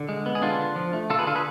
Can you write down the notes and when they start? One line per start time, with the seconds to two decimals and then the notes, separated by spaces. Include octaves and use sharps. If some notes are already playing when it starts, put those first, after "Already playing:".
Already playing: D3
0.09 G#3
0.26 B3
0.35 G#4
0.42 D3 D4 F4
0.59 D3
0.76 F3
0.93 A3
1.10 D3 F4 A4
1.19 G#4 B4
1.27 D3 F4 A4
1.35 G#4 B4